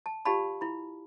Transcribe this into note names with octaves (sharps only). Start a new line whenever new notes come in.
A5
F4 G4 D5 F5 A5 B5
E4 B5